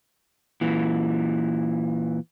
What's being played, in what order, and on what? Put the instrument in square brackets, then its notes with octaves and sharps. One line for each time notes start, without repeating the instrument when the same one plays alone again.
[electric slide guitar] A#2 E3